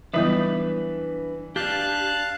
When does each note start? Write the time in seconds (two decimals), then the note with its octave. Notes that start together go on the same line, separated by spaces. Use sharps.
0.14 E3 F#3 G3 B3 D4 B4 E5
1.56 D4 G4 F5 A5 F#6